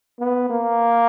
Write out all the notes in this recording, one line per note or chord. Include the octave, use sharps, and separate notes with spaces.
B3
A#3